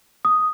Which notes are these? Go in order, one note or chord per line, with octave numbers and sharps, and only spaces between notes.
D#6